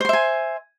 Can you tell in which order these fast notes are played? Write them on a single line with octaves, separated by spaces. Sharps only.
C5 C6 E5 G#5